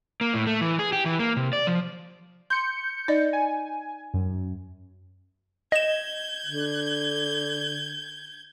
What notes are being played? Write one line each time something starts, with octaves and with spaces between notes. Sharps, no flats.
A#3
A2
A3
E3
G#4
G4
E3
A#3
C3
D5
F3
C6 G6 C#7
D#4 D5 D#5
G#5
F#2
D#5 G6 G#6 E7
D3